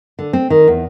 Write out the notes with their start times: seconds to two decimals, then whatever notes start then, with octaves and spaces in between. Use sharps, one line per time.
0.19 D3
0.33 C4
0.50 D#3
0.68 E2